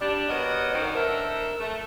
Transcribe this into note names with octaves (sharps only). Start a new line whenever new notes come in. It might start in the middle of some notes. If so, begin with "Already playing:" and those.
G3 D4
B3 F#4 A#4 C#5 D#5
F#2 D3 D#3 C5
D4 E4 A4 A#4
A3